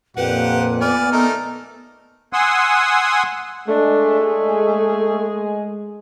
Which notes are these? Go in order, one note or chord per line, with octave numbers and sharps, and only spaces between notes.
F2 A#2 G4 B4 F#5
B3 D5 G#5 F6
A3 D#4 A#4
F#5 G#5 C6 D#6 E6
G#3 A3 D4
G#4